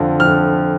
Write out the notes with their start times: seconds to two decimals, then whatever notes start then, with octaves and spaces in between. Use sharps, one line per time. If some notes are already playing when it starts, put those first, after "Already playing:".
Already playing: F2 D3 F3
0.20 F2 F6